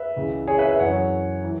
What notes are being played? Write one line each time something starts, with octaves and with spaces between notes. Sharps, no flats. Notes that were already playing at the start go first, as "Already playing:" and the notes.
Already playing: B4 E5
C#2 C#3 E3
G#4 C#5
B4 E5
B4 E5
F#2 E3 C#5 F#5
E3